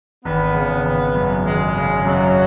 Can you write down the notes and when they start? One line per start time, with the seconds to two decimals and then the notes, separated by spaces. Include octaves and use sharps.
0.25 G#1 B3
0.55 C#3
0.85 G#1
1.14 F#2
1.45 G#1 G#3
1.75 C#3
2.05 F#2 F#3